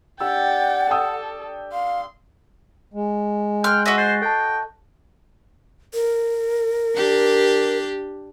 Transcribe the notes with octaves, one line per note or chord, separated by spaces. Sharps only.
D4 G4 D5 F#5 G5 E6 A6
A4 G5 D#6 E6
F5 C6
G#3
G5 C6 F6 F#6
F#4 D#5 E5
C5 A6 C7
A4 G5 A5
A#4
D4 G4